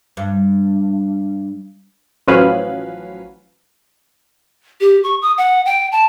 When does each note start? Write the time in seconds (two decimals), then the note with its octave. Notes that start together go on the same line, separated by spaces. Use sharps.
0.17 G2
2.28 A1 F3 F#3 C#4 B4 F5
4.81 G4
5.04 C#6
5.22 D#6
5.38 F#5
5.66 G5
5.92 A5